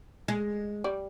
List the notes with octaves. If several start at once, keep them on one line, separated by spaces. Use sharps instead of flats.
G#3
G3 D5